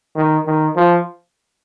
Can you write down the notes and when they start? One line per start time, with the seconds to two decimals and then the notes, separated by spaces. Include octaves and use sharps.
0.16 D#3
0.46 D#3
0.76 F3